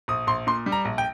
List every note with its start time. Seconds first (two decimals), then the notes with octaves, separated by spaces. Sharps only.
0.08 A#1 D#6
0.27 A#1 C6
0.47 A#2 C6
0.66 G3
0.72 A#5
0.85 A#1
0.98 G5